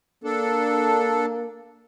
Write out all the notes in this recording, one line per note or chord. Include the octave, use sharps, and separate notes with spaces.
A#3 D4 A4